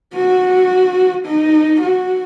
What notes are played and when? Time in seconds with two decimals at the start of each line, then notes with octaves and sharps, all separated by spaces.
0.14 F#4
1.25 D#4
1.81 F#4